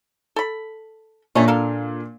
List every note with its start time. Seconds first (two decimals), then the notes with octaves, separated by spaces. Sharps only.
0.36 A4 B5
1.35 A#2 A3 A#3 C#4 D4
1.48 A4 A#4 F5